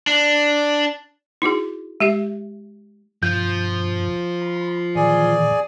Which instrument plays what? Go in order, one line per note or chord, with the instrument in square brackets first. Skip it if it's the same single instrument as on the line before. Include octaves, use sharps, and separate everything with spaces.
[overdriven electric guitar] D4
[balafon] D#4 E4 F#4 G#4
G#3 G4 E5
[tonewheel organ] G2 B2 [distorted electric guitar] F3 [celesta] G6
[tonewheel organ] B5
[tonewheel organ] A#2 D#3 E3 [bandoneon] G#4 D5 G#5